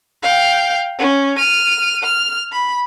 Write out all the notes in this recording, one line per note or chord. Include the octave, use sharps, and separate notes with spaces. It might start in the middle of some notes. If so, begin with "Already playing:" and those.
F5 G5
C#4
F6 D#7
F6
B5